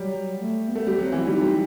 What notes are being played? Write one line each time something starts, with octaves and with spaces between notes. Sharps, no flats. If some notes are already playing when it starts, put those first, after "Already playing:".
Already playing: F#3 G3
A3
B3
A3
G3
F#3 C4
E3
G3 D#4
G3